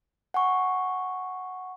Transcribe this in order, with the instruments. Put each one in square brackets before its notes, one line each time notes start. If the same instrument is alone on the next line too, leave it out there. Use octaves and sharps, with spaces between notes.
[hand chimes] F#5 G#5 C#6